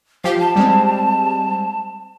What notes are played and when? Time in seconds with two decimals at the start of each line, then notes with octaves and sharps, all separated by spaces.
0.24 F3 G4 F5
0.39 A5
0.56 G3 G#3 C4